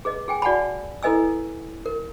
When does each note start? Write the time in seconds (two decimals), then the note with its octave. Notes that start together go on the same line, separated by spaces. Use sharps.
0.05 G#4 B4 D#5
0.28 G#4 G5 G#5
0.42 F#4 D5 F#5 G#5 A5 B5
1.03 E4 A4 B4 D#5 G#5 E6
1.86 A#4